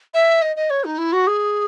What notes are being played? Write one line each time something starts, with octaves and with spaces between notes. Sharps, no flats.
E5
D#5
D#5
C#5
D#4
E4
F#4
G#4